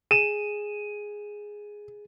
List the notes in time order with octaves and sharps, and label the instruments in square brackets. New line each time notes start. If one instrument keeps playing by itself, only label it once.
[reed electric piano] G#4 [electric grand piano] D#7 E7